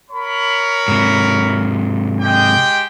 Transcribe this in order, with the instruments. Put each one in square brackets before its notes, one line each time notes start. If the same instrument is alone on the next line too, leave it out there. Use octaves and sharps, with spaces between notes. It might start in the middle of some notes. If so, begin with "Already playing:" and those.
[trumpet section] A#4 C#5 B5
[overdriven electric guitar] G#2 C3
[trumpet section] G#3 G4 G5